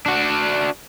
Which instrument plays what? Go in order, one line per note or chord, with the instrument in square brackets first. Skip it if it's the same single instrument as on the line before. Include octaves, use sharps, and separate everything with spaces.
[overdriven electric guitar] D4 F#4